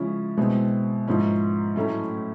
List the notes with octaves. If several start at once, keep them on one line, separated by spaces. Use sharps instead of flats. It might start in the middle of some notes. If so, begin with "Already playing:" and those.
Already playing: C#3 F3 G#3 C#4 E4
B2 G#3 C4 E4
G#2 F3 A#3 C#4 E4
A2 F#3 A3 C#4 E4